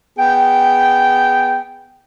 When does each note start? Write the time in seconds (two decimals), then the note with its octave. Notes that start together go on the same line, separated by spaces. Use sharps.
0.19 B3 G#4 G5